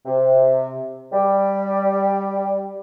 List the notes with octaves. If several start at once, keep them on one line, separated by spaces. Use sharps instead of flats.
C3
G3